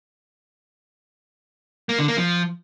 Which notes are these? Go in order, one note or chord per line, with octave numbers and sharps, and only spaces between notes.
A#3
D3
A#3
F3